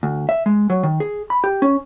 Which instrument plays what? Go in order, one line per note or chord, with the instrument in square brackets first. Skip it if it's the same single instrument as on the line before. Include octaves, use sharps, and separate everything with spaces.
[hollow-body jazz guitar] D2
E5
G#3
F#3
D#3
G#4
B5
G4
C#4